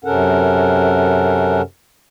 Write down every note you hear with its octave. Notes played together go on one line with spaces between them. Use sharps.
F#2 C3 C#4 A4 A#4 F#5